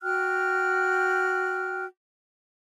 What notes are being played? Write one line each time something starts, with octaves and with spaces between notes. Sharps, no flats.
F#4 G5 F6 F#6